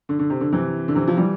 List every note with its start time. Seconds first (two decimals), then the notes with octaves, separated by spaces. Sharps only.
0.09 D3
0.19 D3
0.30 C3
0.41 D3
0.52 C3 E3
0.88 D3
0.95 C3 E3
1.08 F3
1.17 E3 G3